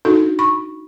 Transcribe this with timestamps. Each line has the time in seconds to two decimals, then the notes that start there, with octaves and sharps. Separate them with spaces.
0.05 D4 D#4 F#4 A4
0.39 B5 C#6